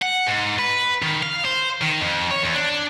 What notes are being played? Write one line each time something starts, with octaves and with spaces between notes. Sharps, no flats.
F#5
G#2
B4
D#3
F5
C5
D#3
F2
C#5
E2
D4